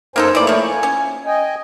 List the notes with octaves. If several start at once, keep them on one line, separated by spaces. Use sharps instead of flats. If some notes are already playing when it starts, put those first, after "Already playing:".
F#2 A#3 D#4 A4 C5 G#5
E3 A3 A#3 E4 D5
F3 C#5
G#5
C#4
D#5 G5 G#5